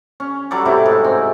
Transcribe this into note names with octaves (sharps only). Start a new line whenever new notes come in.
C#4
F#3 G3 A4 D6
A2 C3 F#3 E4
G#2
C4